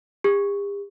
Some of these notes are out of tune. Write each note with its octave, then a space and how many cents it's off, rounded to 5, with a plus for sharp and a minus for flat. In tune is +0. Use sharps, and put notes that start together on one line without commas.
G4 +45